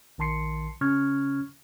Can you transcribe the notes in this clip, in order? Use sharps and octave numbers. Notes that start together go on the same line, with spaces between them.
A#1 D#3 A5 C6 C7 C#7
C#3 C#4 C#6 F6 G#6